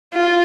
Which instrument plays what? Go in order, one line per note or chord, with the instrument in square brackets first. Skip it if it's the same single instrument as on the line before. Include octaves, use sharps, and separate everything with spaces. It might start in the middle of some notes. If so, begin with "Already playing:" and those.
[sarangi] F4